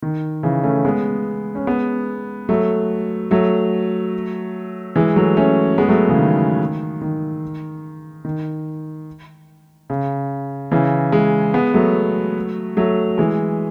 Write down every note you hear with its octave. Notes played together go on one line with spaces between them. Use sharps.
D#3
C#3 E3
A3 C#4
G#3 B3
C#4
G#3 B3
F#3 A3
F#3 A3
E3 G#3
F#3 A3
A3 C#4
G#3 B3
F#3 A3
C#3 E3
D#3
D#3
D#3
C#3
C#3 E3
E3 G#3
G#3 B3
F#3 A3
F#3 A3
E3 G#3